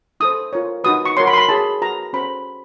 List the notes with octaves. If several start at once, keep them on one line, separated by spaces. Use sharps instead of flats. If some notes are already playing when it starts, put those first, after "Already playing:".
E4 A4 C5 D#6
F4 A#4 C#5
D#4 F#4 B4 D#6
C#6
F#4 A#4 C#5 C6
B5
C6
B5
E4 G#4 C#5 A5
F#4 B4 A#5
C#4 F#4 A4 C5 B5